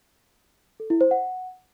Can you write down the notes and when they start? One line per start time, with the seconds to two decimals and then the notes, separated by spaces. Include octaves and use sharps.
0.80 A4
0.90 E4
1.01 C5
1.11 F#5